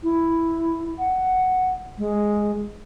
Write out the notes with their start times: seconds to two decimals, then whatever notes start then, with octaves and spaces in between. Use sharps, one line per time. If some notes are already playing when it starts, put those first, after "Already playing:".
0.03 E4
0.99 F#5
1.98 G#3